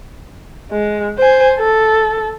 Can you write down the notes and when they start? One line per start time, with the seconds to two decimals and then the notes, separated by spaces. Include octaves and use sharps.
0.71 G#3
1.18 C5 G#5
1.59 A4